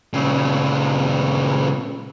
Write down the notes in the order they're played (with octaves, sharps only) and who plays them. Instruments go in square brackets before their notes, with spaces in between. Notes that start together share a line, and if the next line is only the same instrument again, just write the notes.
[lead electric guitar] A#2 C#3